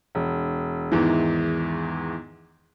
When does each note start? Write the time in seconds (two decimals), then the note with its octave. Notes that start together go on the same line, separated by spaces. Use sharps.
0.15 E1
0.92 E2 G#2 D#3 E3